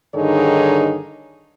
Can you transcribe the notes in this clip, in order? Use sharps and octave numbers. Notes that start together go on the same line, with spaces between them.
G2 D3 D#3 D#4 G#4 C#5